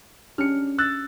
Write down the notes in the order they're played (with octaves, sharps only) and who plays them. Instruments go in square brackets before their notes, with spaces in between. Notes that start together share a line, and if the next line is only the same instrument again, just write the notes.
[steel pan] C#4 D4 G4 [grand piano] F6 C#7
[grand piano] E6 F#6 A6